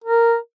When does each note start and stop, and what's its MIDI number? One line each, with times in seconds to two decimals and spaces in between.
0.04 0.36 70